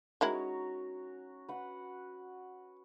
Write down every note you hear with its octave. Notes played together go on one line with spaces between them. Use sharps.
D#3 G#3 C#4 E4 F#4 A#5
B4 F#5